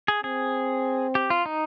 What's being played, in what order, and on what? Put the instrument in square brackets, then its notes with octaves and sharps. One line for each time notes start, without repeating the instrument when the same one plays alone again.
[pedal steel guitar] G#4
[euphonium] C4 [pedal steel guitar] G#4
[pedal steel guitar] G4
F4
D#4